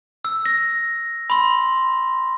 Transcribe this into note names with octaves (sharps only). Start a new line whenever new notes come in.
E6
A#6
B5 C6